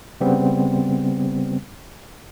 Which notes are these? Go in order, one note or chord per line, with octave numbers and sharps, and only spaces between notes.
C#3 G3 B3 C4